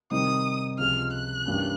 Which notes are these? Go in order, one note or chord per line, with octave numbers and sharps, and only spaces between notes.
C3 D#3 G3 C4 D#4 D#6
C#2 C3 F3 G#3 F6
F#6
G2 E3 G3 A#3 C#4